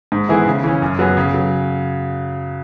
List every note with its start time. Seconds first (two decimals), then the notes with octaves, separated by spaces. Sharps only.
0.12 G#2
0.29 E3 B3 E4 G#4
0.46 C#3
0.64 E3 C#4
0.82 F#2
0.99 F#3 B3 G#4
1.17 C#3
1.34 F#3